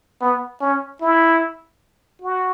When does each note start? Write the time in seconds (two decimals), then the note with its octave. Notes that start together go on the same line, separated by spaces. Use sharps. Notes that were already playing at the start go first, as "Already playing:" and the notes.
0.21 B3
0.61 C#4
1.01 E4
2.22 F#4